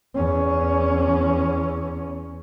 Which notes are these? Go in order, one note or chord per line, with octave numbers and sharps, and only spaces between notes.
E2 C#4